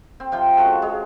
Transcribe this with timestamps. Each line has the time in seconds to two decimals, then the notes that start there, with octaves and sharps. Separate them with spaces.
0.20 C4
0.32 C3 F3 G5
0.57 C#3 G#3 F#4 A4
0.82 G#3